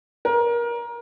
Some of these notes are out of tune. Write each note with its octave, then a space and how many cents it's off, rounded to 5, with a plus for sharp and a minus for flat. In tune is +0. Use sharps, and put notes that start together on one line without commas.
A#4 +25